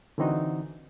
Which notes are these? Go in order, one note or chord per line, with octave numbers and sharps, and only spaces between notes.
D3 E3 C4 D#4 F#4